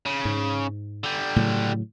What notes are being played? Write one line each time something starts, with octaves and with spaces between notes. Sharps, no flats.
C#3
G#2
D3 G3
A2 C#3 F#3